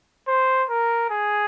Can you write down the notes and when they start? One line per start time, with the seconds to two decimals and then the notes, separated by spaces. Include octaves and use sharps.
0.27 C5
0.70 A#4
1.10 G#4